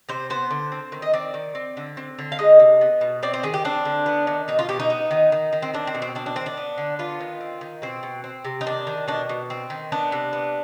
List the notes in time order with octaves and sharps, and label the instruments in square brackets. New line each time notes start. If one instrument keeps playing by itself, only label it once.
[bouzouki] C3 C5
B3 C5
D3
C4
D#3
D#5
C4 D5
D#3
C4
D3
C4
D3
F5
G#3 D#5
C3
B3
B2
C4 D5
C5
D#3 G#4
G4
C4 D4
D3
B3
D#3
B2 D#4
F4
B2 G4
D#4
B3
D#3
D#3
D#3
C4
C4 D4
C4
B2
C4
C4 D4
D4
D#3 C4
D4
B3
D3
B3 F4
D#3
C4
D#3
B2 C4
B2
C4
C3
D#4
D#3 D4
D#3
B2 D4
B2
C4
D#3
B3 D4
C3
B3